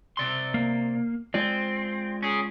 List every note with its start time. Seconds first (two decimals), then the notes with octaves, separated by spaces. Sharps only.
0.17 C3 D5 C6
0.54 A#3
1.34 G#3 C4 F4 D5
2.23 C#4 G#4